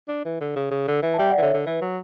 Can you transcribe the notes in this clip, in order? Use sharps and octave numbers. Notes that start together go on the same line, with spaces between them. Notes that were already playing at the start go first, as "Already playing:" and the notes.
D4
E3
D3
C#3
C#3
D3
E3
A5
G3 E5 G5
D5 F#5
E3
D3 C#5 E5
D3
E3 B4
F#3